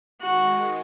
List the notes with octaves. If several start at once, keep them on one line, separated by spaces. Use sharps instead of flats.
D#3 G#3 F#4